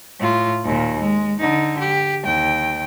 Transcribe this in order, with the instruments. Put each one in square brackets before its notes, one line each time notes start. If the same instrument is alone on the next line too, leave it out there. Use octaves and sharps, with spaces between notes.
[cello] A2 F4
D#2 A#2
G#3
D3 D#4
G4
D#2 G5